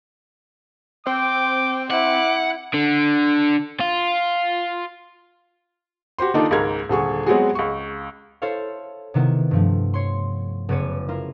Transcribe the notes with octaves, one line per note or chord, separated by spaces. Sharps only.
C4 G5 D6
E4 F#5 D6
D3
F4
F#4 G4 C5 C6
D#3 A#3 D4 D#4 F4 A4
C#2 G#2 G#3 A#4 G#6
D#1 D3 G#4 C#6
F#3 G#3 B3 C4 F#4 G#4
C#2 C#6
E4 A4 C5 C#5 F5
C3 D#3 B3 E4
G2 F3 A3
C#5 C6
F#1 B3 C#5 D5 D#7
E4 F4 A#4